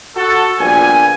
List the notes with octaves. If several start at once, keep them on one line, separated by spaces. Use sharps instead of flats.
F#4 A4
A#1 A#2 G3 B3 G#5